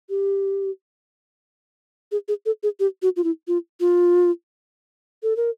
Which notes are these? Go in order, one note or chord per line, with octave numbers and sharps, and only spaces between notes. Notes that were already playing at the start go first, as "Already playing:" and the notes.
G4
G#4
G#4
A4
G#4
G4
F#4
F4
E4
F4
F4
A4
A#4